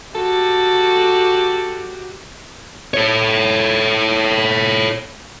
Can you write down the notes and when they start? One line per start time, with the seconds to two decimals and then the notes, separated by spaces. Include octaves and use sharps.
0.15 F#4 G4 A4
2.94 A4 C#5